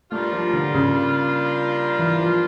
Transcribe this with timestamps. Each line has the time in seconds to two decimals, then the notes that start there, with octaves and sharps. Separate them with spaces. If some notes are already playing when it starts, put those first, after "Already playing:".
0.12 G3 A3 A#3 D4 F4
0.33 F3
0.53 D3
0.74 C#3
1.99 E3
2.20 F3